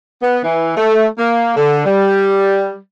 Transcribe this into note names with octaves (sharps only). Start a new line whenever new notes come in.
B3
E3
A3
A#3
D3
G3